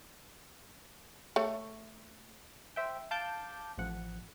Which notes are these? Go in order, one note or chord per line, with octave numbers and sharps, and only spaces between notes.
A3 C#5
C5 E5 G5
F5 A5 D6 G6
A1 F3 F#5